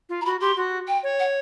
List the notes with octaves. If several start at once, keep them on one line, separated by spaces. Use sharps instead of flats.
F4
A#5
F#4 B5
G4 C6
F#4
G5
C#5
F#5